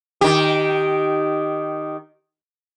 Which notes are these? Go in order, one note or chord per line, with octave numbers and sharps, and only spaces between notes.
D#3 G4